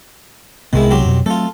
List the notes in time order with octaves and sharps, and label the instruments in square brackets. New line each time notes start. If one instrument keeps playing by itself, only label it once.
[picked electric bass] C2 C3 B3 [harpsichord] D#3 G#3 E4
[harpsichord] F#3 C4 G4
[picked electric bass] F2 B2
[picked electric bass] F#3 A3 C4 [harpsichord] F4 A4